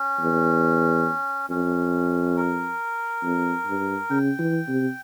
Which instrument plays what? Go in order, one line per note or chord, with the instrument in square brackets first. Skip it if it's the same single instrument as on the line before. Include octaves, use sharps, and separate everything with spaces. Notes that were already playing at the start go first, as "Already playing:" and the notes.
Already playing: [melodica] C#4
[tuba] E2
[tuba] F2 [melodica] C#4
[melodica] A#4
[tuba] F2
G2
[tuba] C#3 [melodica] G5
[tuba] E3
C3